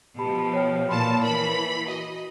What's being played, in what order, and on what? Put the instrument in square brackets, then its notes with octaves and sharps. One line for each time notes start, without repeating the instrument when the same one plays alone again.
[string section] B2 F3 [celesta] G4 A5 B5
[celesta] C#5 G5 F6
[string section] A#2 E3 A5 [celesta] B5 C6 F6
[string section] E3 B5 [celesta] A#4
[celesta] F#4 [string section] D#5